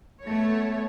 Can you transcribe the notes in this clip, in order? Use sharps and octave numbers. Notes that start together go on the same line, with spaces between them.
A3 B3 C#5